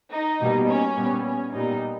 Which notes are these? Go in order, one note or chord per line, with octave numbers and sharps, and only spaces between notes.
D#4
B2 G3 A#3
C#4
A#2 G3 B3
C#4
A#2 G3 B3 D#4